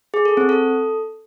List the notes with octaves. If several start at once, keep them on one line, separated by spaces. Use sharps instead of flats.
G#4
A4
C4
A4